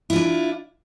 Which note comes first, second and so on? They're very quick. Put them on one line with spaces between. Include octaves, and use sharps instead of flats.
E4 F4 D4